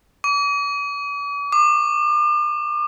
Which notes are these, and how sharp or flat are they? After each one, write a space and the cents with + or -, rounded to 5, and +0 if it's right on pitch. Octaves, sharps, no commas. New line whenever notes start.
D6 -45
D6 +40